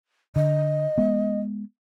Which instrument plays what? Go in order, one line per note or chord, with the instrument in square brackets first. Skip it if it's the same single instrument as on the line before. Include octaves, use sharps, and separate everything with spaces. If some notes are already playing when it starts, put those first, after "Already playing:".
[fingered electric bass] D3 [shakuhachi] D#5
[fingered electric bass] G#3 B3